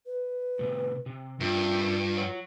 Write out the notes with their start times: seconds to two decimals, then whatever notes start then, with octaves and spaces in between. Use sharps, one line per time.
0.06 B4
0.59 A2 C3
1.06 C3
1.40 G2 G3 F4 A#4 E5
2.17 C#5 F#5